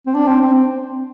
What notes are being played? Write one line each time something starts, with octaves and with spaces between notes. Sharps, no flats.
C4
D4
C4
C4
C4